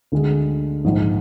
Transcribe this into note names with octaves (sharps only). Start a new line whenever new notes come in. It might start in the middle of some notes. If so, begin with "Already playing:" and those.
D2 D3 G#3
A#1 G#2 F3